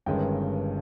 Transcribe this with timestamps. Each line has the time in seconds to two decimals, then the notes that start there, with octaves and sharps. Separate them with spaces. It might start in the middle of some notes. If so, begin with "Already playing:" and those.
0.06 G1 G2 D#3 G#3 C#4 G5